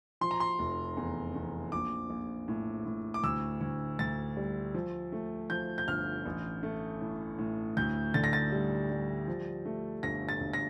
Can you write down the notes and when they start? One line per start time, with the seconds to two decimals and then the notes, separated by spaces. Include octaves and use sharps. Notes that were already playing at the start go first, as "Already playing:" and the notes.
0.21 F3 C6
0.31 A#5
0.40 C6
0.59 F1
0.97 E2
1.35 E2
1.72 A#1 D6
2.10 A#1
2.48 A2
2.86 A2
3.14 D6
3.23 D2 E6
3.61 D2
3.99 D2 A6
4.37 G3
4.74 F3
5.12 A3
5.50 F3 G6
5.78 G6
5.88 G1 F6
6.25 A1
6.63 A3
7.01 A2
7.39 A2
7.77 D2 G6
8.14 D3 A6
8.24 A#6
8.33 A6
8.52 G3
8.90 G3
9.27 F3
9.65 A3
10.03 G1 A#6
10.29 A6
10.40 G1
10.53 A#6